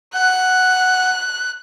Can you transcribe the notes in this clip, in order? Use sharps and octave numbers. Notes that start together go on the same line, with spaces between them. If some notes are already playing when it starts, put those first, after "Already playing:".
F#5 F#6